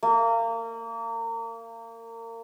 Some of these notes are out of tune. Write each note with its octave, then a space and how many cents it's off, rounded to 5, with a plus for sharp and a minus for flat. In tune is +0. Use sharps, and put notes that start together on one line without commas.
A#3 -30